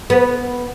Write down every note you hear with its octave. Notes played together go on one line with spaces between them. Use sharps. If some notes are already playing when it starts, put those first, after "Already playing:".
B3